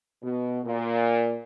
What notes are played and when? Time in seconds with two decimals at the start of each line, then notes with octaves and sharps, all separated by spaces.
0.23 B2
0.64 A#2